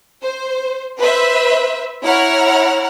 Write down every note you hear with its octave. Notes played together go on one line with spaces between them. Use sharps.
C5
B4 C5 E5
E4 C#5 F#5 A#5 F6